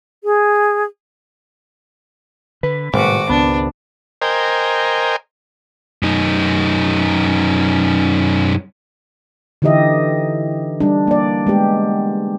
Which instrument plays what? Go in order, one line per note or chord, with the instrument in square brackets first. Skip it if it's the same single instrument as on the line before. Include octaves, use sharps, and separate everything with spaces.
[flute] G#4
[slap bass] D3 [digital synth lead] B4
[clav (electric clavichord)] G#1 [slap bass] A2 C3 G3 [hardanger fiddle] F#4 D6
[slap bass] C#2 [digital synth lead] B3 [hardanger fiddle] D4
[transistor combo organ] A#4 C5 D#5 G5 G#5
[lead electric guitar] F#2 D#4
[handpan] D3 E3 D#4 G4 D#5 E5
G3 D4
A#3 D5
G#3 B3 G4